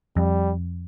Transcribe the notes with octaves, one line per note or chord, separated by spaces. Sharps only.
F2 G3